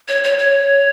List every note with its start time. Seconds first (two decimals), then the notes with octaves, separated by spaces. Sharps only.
0.08 C#5
0.24 C#5
0.38 C#5